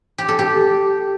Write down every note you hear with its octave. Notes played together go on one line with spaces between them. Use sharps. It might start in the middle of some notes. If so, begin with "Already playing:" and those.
G4
A4
G4